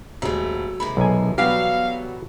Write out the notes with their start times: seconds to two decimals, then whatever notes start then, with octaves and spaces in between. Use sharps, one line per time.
0.22 D#1 F#3 G#3 A3
0.80 C3 D#3 G#3 B5
0.97 B1 G#5
1.38 B2 E3 F#3 G3 B3 G4 A4 F5